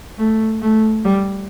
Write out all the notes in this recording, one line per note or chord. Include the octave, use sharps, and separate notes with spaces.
A3
A3
G3